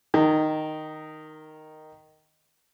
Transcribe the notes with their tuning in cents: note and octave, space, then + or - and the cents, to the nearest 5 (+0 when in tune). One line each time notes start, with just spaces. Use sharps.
D#3 +0 A#5 -30